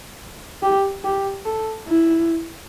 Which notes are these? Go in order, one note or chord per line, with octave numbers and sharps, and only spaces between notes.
G4
G4
A4
E4